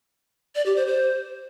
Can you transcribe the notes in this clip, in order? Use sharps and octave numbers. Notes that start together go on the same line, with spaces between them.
D5
G4
C5
C5